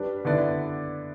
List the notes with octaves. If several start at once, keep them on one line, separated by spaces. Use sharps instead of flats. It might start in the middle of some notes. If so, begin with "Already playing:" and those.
Already playing: G3 D4 B4 D5
D3 B3 E4 B4 D5